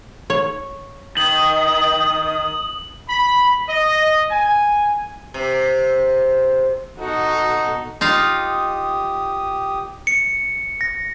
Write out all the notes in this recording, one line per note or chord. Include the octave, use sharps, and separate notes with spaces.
C#5
D#3 D#6 F#7
B5
D#5
G#5
C3
B2 D#4 F#4 A4
D#4 F4 G4 F5 D#6
C#7
A#6